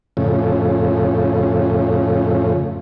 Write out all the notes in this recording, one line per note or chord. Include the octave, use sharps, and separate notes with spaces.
F2 A2 C#3